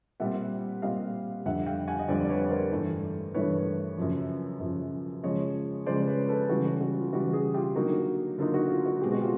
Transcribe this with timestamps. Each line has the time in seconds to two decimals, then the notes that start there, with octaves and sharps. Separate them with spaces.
0.20 A#2 G3 C4 E5 F#5
0.82 A#2 G3 C4 D#5 F5
1.45 F2 D3 G3 E5 F#5
1.66 F5 G5
1.88 F#5 G#5
1.99 D#5
2.08 F2 D3 G3 C5 D5
2.24 D5
2.29 B4 C#5
2.50 A#4 C5
2.72 G2 E3 A3 D4
3.34 G2 E3 A3 D4 B4 C#5
3.98 F#2 C#3 F3
4.60 F#2 C#3 F3
5.23 C#3 F3 G#3 C#5 D#5
5.86 C#3 F3 G#3 C5 D5
6.07 B4 C#5
6.29 A4 B4
6.49 C#3 E3 G3 F#4
6.65 F#4
6.81 F#4
6.97 F4
7.12 C#3 E3 G3 F#4
7.33 F#4 G#4
7.54 F4 G4
7.76 D3 F#3 A#3 D#4 F#4
8.38 D3 F#3 A#3 D#4 F4
8.54 F#4
8.70 F4
8.86 F#4
9.01 B2 G#3 C4 G4
9.12 F#4
9.21 F4 G4